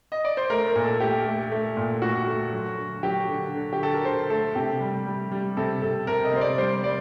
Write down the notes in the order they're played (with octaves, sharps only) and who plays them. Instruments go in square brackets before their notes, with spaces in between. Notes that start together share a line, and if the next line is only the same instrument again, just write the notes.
[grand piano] D#5
D5
C5
A3 A#4
A#4
A#2
A4
A3 G4
A3
A3
A#2
A3 F#4
A3
F#3
D3
F#3 G4
D3
D3
G4
D3 A4
A#4
D3 C5
A3 A4
C3 G4
G3
G3
G3
C3 A4
C3 A4
C3 A#4
D#5
C3 C5
D5
G3 C5
G3 D5